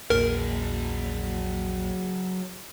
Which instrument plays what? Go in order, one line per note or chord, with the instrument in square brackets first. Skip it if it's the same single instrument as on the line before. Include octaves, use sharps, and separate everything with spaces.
[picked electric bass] A#1 E2 A#2 [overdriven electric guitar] F#3 G#4 [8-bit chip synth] A#4